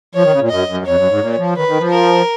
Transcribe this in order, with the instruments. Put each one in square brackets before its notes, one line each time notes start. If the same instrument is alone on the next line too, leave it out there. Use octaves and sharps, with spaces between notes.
[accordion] F3 [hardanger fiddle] C#5
[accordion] D#3
C#3
A#2
[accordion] F#2 [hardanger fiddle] D#5
[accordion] F#2
[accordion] F2 [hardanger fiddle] C#5
[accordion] F#2
G#2
A#2
F3
[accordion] D#3 [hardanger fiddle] B4
[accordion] D#3
F3
[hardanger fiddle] A#4